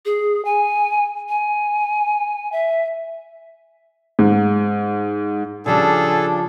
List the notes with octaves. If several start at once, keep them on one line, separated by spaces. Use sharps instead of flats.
G#4
G#5
G#5
E5
G#2
C#3 F3 G3 D4 G#4 A4